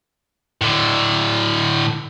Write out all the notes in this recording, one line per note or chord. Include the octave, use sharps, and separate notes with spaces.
A2 D3